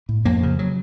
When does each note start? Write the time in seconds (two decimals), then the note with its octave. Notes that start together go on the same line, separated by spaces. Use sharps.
0.09 A2
0.25 F2 A#3
0.43 C#3
0.59 F#3